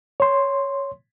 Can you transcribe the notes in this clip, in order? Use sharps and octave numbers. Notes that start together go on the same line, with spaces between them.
C#5 C6